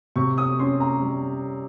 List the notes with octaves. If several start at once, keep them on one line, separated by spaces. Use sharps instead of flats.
C3 C#6
D#6
C#4 C6
A#5
G3